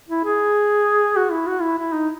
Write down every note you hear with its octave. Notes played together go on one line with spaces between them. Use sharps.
E4
G#4
F#4
E4
F#4
E4
E4
D#4